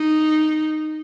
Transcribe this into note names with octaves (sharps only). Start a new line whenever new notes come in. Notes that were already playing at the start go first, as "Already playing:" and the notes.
Already playing: D#4